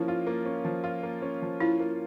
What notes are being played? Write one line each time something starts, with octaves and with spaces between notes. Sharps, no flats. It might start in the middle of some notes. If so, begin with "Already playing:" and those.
Already playing: F3 A#3 C#4 E4
F4
A#3
C#4
F3
F4
A#3
C#4
F3
E4 F4
A#3